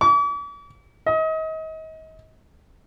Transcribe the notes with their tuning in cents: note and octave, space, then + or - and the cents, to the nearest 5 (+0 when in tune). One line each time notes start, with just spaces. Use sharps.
D6 -45
D#5 +35